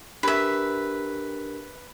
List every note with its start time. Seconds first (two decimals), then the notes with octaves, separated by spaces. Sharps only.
0.23 D4 G4 A#4 B4 E5